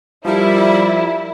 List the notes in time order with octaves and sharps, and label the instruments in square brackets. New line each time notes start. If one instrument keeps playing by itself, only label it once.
[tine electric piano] F3 A#4 [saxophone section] G3 [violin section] E4